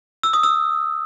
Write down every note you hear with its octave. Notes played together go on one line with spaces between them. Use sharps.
E6
D#6
E6